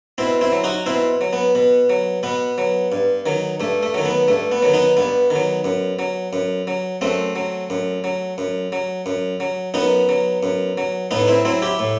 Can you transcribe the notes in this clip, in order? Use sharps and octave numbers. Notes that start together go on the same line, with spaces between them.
B2 C4 E4
C4 E4
F#3
D#4 F#4
B2 C4 E4
F#3
B3
B2
F#3
B2 B3
F#3
G2
D#3 F#3
G2 A3
A3
D#3 F#3
B3
G2 A3
B3
D#3 F#3
B3 D#4
G2 B3
D#3
F#3
F#2
F#3
F#2
F#3
F#2 A3 C4
F#3
F#2
F#3
F#2
F#3
F#2
F#3
F#2 B3 D#4
F#3
F#2
F#3
A2 B3 D#4
C4 E4
F#3 C4 E4
E4 G4
A2